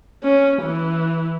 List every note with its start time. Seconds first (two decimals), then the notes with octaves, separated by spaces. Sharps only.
0.24 C#4
0.63 E3